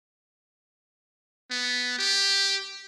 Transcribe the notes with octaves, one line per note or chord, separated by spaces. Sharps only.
B3
G4